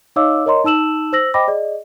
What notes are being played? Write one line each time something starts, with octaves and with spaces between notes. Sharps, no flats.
D#4 C#5 D#5 F5 D6 E6
A#4 C#5 D#5 A#5 C6
D#4 A5 E6 E7 F#7
C5 E6 A#6 F#7
C5 D#5 G5 B5 D6 A#6
G#4 D5 D#5